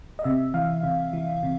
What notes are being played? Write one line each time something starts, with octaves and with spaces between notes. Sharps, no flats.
D#5
C3 E5
E3 F5
C3
E3
C3